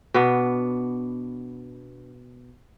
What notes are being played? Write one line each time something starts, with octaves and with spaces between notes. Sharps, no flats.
B2 B3 D4